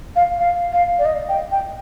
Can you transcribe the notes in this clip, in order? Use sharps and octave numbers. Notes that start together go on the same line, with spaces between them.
F5
F5
F5
D5
D#5
G5
G5